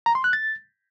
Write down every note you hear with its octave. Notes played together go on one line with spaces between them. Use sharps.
A#5
C6
F#6
A6